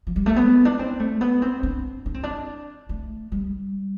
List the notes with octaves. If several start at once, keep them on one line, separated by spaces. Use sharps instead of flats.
F3
G3
A3
B3
D4
C4
A3
B3
C4
D4
D4
C4
D4
A3
G3